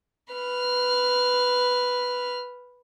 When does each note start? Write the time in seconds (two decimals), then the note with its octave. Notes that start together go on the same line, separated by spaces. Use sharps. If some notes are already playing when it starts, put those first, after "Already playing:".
0.33 B4 F6